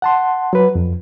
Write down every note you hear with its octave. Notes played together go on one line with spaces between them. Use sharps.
F#5 A5 C6
F#3 B4
F2